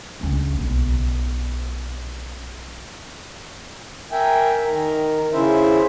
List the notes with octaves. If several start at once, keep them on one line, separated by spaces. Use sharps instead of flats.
C#2 D4
B1
A#4 E5 G5 G#5
D#3 A#4
C#3 C#4 E4 C5 E5